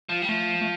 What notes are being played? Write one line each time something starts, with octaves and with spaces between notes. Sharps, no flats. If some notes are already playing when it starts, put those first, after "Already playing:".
F3
G3
F3 A3
A3